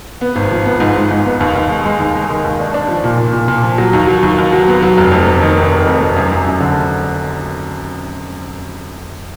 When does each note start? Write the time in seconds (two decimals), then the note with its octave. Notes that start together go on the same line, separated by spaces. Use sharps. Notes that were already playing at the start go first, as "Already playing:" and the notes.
0.21 B3
0.35 G#1
0.51 F3
0.65 B3
0.80 G#2
0.95 G#2
1.11 G#2
1.26 B3
1.40 D#2
1.55 D#2
1.69 G#3
1.85 G#3
2.00 D#2
2.15 G#3
2.30 D#3
2.44 D#2
2.60 D4
2.74 D4
2.89 F3
3.04 A#2
3.18 A#2
3.33 A#2
3.48 A#2
3.63 F3
3.78 F#3
3.93 D#2
4.08 F#3
4.23 D#2
4.38 D#2
4.53 F#3
4.68 B3
4.83 F#3
4.97 F1
5.12 F2
5.27 F1
5.42 D#3
5.57 F1
5.72 F1
5.87 F2
6.01 F1
6.16 F#2
6.32 F#2
6.46 F#2
6.60 D3